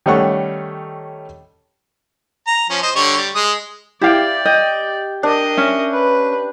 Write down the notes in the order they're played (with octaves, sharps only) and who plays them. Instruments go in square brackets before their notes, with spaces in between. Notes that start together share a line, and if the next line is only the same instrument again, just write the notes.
[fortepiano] D#3 G3 A3 C#4 F#5 C#6
[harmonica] A#5
F3 C#4
C5 D#5
D3 G3 C#5
G3
G#3 D#6
[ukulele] E4 F5 G5 [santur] G4 [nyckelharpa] D5
[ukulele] D#5 [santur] G5
[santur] D4 [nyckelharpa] A#4 D#5
[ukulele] C#4 E5
[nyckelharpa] B4